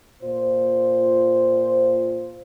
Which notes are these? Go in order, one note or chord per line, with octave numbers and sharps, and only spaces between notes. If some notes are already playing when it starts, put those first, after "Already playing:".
A#2 F4 C5